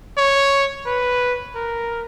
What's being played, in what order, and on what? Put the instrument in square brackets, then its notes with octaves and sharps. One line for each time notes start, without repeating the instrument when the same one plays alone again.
[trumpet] C#5
B4
A#4